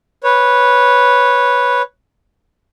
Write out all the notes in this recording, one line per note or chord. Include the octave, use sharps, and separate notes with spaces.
B4 C#5